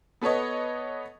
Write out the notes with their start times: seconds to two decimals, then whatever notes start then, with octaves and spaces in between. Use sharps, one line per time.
0.21 B3 A4 B4 C#5 D#5